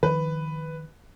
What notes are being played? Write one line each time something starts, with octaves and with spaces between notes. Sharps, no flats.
D#3 F3 B4